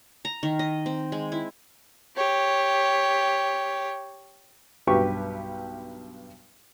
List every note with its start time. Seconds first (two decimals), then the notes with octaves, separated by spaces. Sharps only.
0.25 A#5
0.43 D#3
0.59 D#5
0.86 C4
1.12 G#3
1.32 E4
2.16 G4 C#5
4.87 B1 G2 G4 B4 G5 C#6